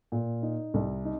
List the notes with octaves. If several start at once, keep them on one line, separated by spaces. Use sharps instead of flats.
A#2
D#4
C2
D#4